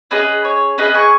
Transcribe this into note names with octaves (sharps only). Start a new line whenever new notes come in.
C#4 G#4 B4 D#5
C#5
C#4 G#4 B4 D#5
G#5 C#6